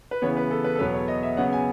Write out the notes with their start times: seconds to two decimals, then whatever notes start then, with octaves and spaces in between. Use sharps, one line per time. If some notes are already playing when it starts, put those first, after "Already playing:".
0.11 B4
0.22 C#3 E3 B3 C#5
0.37 B4
0.51 A4
0.64 B4
0.75 A4
0.79 E2 B2 F#3 B3 B4
0.94 C#5
1.08 D#5
1.23 E5
1.37 C#3 F#3 B3 F#5
1.53 G#5